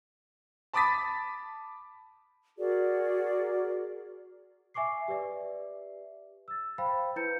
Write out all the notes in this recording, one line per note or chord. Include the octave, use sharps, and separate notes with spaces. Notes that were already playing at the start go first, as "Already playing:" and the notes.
A5 B5 D6 D#6 A6 B6
F#4 G#4 A#4 D5
E5 G#5 C#6 D6 C7
G4 B4 D5 E5
E6 A6
C5 F5 G5 B5
E4 B4 A#5 G6 C#7